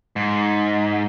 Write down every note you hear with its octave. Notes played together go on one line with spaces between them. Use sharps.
G#2